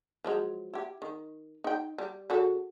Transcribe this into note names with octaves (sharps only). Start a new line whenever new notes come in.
F3 F#3 G#3
E4 G4
D#3
D#4 G5
G3
C#3 F#4 A4